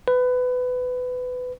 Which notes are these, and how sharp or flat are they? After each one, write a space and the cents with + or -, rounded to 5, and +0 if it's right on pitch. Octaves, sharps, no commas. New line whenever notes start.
B4 +20